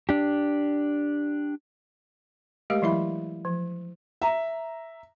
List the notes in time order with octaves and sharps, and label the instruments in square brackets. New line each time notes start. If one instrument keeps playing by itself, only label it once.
[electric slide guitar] D4 G4
[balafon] G#3 A3 G4 A#4 D#5 F5
E3 F#3 E4 E5 B5
F3
[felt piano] E5 A#5